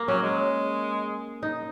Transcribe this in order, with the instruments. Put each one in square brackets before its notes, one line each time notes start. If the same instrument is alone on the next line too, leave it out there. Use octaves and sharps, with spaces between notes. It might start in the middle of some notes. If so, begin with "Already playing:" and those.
Already playing: [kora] A#3
[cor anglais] F#3 [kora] C#4
[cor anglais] G#3
[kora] D#4